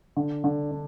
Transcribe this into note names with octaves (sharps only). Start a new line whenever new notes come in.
D3
D3
D4